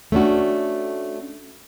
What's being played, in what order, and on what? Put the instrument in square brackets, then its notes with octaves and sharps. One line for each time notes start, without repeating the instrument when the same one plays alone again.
[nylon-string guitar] A3 C#4 D4 F#4